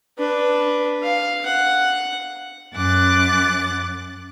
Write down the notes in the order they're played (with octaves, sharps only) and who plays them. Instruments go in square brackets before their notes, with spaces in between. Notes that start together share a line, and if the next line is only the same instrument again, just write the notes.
[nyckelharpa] D4 B4
F5
F#5
[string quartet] F#2 D6 F#6 A6